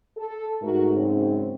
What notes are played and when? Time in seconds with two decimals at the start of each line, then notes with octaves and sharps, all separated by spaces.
0.17 A4
0.62 G#2 A3 F#4 A#4
0.93 F#2 C#3 C4